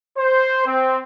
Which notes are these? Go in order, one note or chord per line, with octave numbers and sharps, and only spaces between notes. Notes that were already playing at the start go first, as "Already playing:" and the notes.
C5
C4